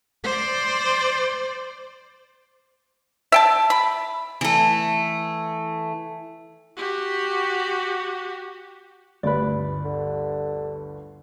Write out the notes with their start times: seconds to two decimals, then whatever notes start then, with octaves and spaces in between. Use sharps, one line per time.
0.24 C5 D5
3.32 E5 G5 A5
3.70 B5
4.41 E3 A3
6.77 F#4 G4
9.23 G1 D2 G2 B4 D5
9.85 D3